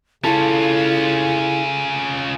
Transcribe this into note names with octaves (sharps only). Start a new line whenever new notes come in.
C#3 C#4 E4 F4 A4